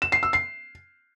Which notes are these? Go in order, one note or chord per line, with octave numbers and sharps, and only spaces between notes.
E7
C7
E6
C7